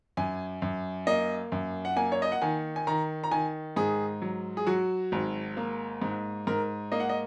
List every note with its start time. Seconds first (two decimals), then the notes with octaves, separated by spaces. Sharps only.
0.17 F#2 G#5
0.62 F#2
1.07 A#3 D#5
1.52 F#2
1.85 F#5
1.96 A#3 G#5
2.12 C#5
2.22 D#5
2.32 F#5
2.42 D#3 G#5
2.76 G#5
2.87 D#3 A#5
3.24 A#5
3.31 D#3 G#5
3.76 G#2 G#4
4.22 F#3
4.57 G#4
4.67 F#3 F#4
5.12 G#1
5.57 A#3
6.02 G#2
6.47 G#2 A#4
6.92 A#3 D#5
7.00 F#5
7.09 D#5